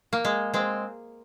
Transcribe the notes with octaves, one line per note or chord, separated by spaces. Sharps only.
A#3
G#3
G#3 C4